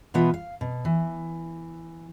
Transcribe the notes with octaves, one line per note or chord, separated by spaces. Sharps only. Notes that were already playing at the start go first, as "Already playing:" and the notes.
B2 E3 B3 F4 B4
F5
B2
E3